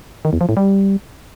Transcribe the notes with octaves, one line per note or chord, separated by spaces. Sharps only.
D#3
E2
F3
A2
G3